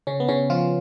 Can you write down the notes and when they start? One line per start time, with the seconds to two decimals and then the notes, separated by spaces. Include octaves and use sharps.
0.07 C#3 C#4
0.20 B3
0.28 C#3 C#4
0.50 F3 F4